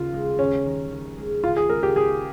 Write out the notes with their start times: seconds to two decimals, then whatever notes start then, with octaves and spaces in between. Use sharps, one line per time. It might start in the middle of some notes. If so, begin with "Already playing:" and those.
Already playing: D#2 C#3 F4
0.13 G#3
0.39 D#3 C#4
0.66 D#3
0.91 D#3
1.17 G#3
1.44 C#2 F4
1.57 G#4
1.69 G#3 A#4
1.83 G4
1.95 G#3 G#4